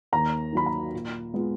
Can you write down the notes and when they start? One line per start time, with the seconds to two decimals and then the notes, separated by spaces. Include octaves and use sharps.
0.13 D#2 A#5
0.53 D#3 F#3 A#3 B5
0.66 A#5
0.93 A#2
1.34 G#3 B3 F4